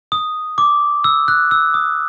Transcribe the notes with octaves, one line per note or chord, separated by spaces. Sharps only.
D#6
D6
E6
F#6
E6
D#6